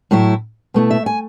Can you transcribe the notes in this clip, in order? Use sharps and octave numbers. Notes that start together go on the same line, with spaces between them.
A2 F#3 A3 E4
B2 A3 E4
E5
G#5